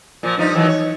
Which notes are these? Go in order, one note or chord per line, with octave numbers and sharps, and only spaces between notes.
A#2 F3
G2 F3 D#4
D#3 E3 F#3
C#5